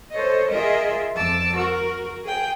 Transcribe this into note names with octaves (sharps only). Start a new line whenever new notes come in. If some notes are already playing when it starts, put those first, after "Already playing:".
A4 C5 C#5 D#5
F4 G#4 A#4 D#5 E5
F2 A5 D6 E6 A6
F#4 A#4
G#4 G5